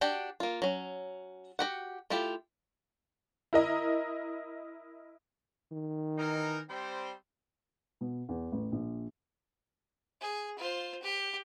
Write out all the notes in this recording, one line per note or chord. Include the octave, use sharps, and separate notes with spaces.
D4 F#4 G4 D5 G5
A#3 F4
F#3 C#4
F#4 G4 F#5
A3 E4 F4 G4
E4 A#4 D#5
D#3
E3 D#4 A#4
G3 C4 C5
B2
E2
A1
A#1
G#4
F4 C5
G4